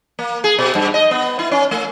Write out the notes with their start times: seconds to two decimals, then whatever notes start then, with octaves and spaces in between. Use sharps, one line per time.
0.19 A#3
0.44 G#4
0.59 B2
0.75 G2
0.94 D#5
1.11 B3
1.39 E4
1.51 C#4
1.71 A3